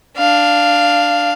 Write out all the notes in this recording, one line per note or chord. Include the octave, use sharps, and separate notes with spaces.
D4 F5